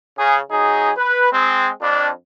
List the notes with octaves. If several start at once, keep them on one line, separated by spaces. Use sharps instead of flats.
C#3 G#4
F#3 D#4 G#4
B4
G#3 C4
F2 D4